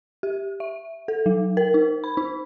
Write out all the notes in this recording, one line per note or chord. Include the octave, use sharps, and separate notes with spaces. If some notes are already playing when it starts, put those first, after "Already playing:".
G4
E5
A4
F#3
A#4
D#4
B5
D#4